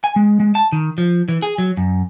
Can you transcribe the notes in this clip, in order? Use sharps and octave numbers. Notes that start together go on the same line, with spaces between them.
G#5
G#3
G#3
A5
D#3
F3
E3
G#4
F#3
F#2